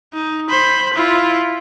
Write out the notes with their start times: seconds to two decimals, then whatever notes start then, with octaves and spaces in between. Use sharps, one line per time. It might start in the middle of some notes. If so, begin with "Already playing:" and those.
0.13 D#4
0.50 C5 B5
0.94 E4 F4